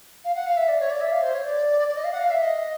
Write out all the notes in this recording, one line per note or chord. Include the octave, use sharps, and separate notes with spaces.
F5
F#5
F5
E5
D5
C#5
D5
E5
F5
C5
C#5
D5
D5
D#5
F5
F#5
F5
E5
D#5